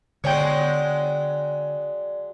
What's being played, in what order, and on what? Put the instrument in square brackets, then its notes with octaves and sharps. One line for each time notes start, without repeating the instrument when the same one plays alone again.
[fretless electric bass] D3 B3 [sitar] F#3 G#3 [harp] C#5 G5 [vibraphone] D5